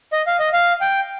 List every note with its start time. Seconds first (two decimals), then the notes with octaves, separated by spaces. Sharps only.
0.13 D#5
0.27 F5
0.40 D#5
0.53 F5
0.81 G5